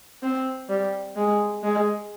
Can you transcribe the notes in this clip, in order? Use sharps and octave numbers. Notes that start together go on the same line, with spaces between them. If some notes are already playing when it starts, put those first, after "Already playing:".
C4
G3
G#3
G#3